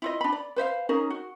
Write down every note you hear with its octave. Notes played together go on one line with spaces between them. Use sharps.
E4 F4 D#5
D4 B5
D5
B4 C5 E5 F5
C#4 D#4 G#4 A#4
F#4